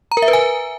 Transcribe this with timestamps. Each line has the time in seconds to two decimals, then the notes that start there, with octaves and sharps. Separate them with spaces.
0.12 A#5
0.17 A#4
0.22 E5
0.28 B4
0.33 G#5